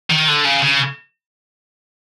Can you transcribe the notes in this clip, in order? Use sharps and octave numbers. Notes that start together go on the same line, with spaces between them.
D#3
D3
C#3
C#3